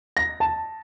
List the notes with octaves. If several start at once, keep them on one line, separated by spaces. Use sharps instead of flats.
A#6
A5